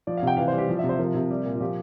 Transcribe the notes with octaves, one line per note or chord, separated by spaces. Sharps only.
F3 D5
F5
C3 G5
E3 F5
G3 C5
G4
F3
C3 E5
C5
F3 A#4
C3
G3
A#2
F4
F3 G4